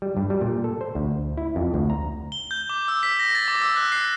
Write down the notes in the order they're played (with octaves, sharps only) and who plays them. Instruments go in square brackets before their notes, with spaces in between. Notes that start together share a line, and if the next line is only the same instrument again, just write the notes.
[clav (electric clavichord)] G3
G2
G3
A#2
A4
C5
D2
E4
F2
D2
A#5
[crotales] G7
G6
D6
E6
B6
A#6
A6
D6
E6
F#6
C7